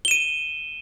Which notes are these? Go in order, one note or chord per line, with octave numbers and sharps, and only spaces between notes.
D#7 E7 G7